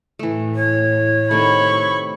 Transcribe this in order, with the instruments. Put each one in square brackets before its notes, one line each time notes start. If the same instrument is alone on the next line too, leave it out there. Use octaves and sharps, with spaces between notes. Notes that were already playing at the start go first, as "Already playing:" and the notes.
[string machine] A2 [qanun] E3 A3
[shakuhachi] C#5
[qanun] C3 D#3 A3 [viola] B5 C#6